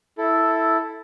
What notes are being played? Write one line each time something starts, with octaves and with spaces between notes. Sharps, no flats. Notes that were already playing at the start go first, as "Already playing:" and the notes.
E4 A4